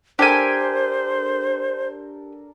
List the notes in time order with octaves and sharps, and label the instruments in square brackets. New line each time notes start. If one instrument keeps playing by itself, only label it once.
[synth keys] D4 A4 A#4 [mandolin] G4 G5 G#5 [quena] C5